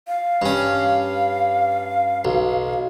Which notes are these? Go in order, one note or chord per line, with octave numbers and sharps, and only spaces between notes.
F5
G2 C#4
B1